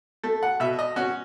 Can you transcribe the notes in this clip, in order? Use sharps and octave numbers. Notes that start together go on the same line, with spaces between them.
A3 A4
F#5
B2 E5
D#5
C#4 F#4